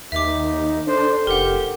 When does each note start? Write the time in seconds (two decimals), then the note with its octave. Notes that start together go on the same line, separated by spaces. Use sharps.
0.12 D#2 D#4 E5 D6
0.87 D4 A4 C5
1.27 F1 G4 A#4 F#5